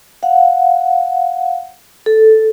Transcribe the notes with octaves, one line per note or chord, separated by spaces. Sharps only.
F5 F#5
A4